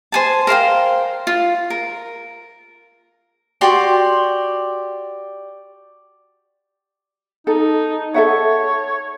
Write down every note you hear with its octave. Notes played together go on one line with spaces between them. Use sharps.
C5 G#5 A5
A#4 C5 F5 G5
F4
A#4
F#4 G4 D5 C6
D#4 A4
A4 C#5 E5 F#5